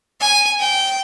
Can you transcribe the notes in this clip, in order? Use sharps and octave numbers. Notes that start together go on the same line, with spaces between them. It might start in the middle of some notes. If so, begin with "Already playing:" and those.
G#5
G5